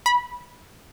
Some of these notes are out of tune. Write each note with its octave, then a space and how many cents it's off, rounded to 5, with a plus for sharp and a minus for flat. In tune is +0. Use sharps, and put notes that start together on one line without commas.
B5 -15